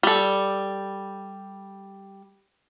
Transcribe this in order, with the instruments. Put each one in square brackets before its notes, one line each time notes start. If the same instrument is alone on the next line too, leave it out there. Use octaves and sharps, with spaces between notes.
[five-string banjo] G3 A4